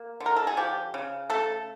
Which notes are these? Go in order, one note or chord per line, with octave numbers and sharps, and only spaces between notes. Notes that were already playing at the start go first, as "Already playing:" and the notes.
Already playing: A#3
D3
A#4
A4
G#4
F3 G4
C#3
A3 A4